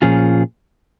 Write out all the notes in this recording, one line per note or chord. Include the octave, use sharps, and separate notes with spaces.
A#2 F3 C#4 F4 G#4